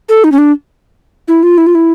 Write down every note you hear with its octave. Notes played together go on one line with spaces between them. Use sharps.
A4
D#4
C#4
D4
E4
F4
E4
F4
E4